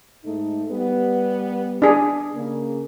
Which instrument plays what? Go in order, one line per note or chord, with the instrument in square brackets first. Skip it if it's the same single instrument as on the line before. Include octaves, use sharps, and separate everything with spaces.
[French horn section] G#2 A3 D#4
G3 B3
[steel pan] D4 G#4
[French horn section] C#3 A#3